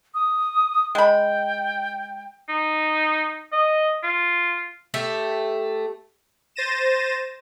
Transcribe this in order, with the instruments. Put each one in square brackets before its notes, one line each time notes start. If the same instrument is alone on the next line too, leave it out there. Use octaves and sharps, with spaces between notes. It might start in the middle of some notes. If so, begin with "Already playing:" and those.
[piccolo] D#6
[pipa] G#3 B5 [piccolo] G5
[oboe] D#4
D#5
F4
[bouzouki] A3 G4 E5
[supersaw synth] C5 A6 A#6 D#7 E7